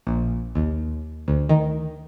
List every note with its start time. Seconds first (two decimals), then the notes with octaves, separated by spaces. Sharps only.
0.07 A#1
0.55 D#2
1.28 D2
1.49 D#3